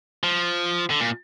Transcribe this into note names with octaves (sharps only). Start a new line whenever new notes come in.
F3
D3
A#2